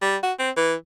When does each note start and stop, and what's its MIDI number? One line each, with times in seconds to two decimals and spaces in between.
0.02 0.16 55
0.23 0.33 66
0.39 0.50 60
0.57 0.74 52